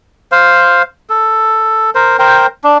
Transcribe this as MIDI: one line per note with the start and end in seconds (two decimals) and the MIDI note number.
0.32 0.82 72
0.32 0.82 77
1.10 1.90 69
1.95 2.17 70
1.95 2.17 72
2.19 2.46 70
2.19 2.46 72
2.19 2.46 79
2.64 2.78 62